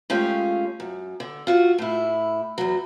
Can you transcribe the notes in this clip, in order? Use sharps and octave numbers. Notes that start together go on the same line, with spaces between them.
G#3 A3 C#4 F4 G4 F5
F#2
D3
F4 F#4 F#5
A2 E4
E2 F#3